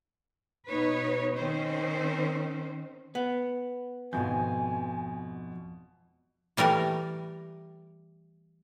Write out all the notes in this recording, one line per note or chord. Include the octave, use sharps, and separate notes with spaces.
B2 D#4 B4 C#5
D#3 C4 C#4 C5
B3
G#1 F2 B2 G#5 G6
E3 G3 A3 A#4